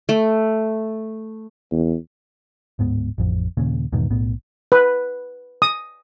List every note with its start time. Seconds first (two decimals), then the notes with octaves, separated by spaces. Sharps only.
0.09 A3
1.72 E2
2.79 D1 G#2 B3
3.18 A1 F2
3.57 D#2 A#2 C#3
3.92 E2 G#2 B2 D#3
4.10 B1 A2 B3
4.72 B4
5.62 D#6